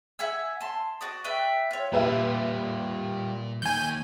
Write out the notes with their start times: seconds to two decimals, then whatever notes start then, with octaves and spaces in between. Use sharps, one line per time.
0.19 E5 F#5 G#5 E6
0.61 A5 C6
1.01 F#4 D5 D#6
1.24 B4 D5 E5 G5
1.71 F4 C#5
1.92 A#2 G3 F4 G4 B4 E5
3.62 D#2 G#5 G6